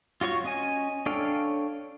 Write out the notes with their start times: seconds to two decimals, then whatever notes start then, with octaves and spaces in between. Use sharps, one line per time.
0.21 F4 F#4 C#5 C#6
0.45 C#4 D#5 G#5
1.06 D4 A4 C#5 F5 G5